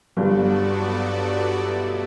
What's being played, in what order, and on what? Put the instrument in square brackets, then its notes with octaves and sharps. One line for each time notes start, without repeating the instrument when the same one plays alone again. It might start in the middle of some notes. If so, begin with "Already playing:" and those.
[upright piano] G1 G2 [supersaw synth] F#3 B3 F#4 A4 D5
[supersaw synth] B2 A3 E4